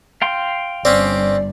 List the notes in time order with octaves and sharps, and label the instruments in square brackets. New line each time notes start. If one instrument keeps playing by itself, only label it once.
[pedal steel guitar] F5 G5 C6
[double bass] G1 [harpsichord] C4 C#4 [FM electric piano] D5